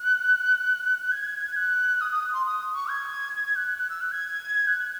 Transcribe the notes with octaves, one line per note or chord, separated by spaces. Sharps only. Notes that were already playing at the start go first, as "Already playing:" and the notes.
Already playing: F#6
G#6
F#6
D#6
D#6
C6
D#6
C#6
G#6
G#6
F#6
F#6
E6
F#6
G#6
F#6